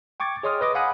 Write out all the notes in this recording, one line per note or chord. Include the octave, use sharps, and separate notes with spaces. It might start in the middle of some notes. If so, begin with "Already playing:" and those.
G5 C#6 D6 G#6 A6
G#4 C#5 D#5 C6 D#6 F6
B4 D#5 D6
F5 F#5 G#5 B5 D#6 F#6